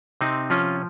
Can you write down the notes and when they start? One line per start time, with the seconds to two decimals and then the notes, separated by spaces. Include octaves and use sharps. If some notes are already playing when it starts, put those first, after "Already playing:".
0.21 C3 C4 D#4
0.50 F3 C#4 F4